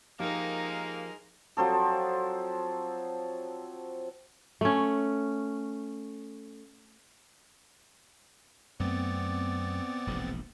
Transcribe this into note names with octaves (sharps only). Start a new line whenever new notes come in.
F3 G#3 A#3 D#4 G4 A#4
F3 F#3 C4 A4
A3 C#4
F#2 A3 B3 C4 D5 A6
E1 A#1 G#2